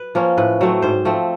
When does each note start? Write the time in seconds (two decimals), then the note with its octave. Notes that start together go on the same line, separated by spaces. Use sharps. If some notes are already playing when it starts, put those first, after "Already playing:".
Already playing: B4
0.15 F3 A#3 C#4
0.38 A2 B4
0.61 F#3 A3 C4
0.82 G#2 C5
1.05 F3 A3 C4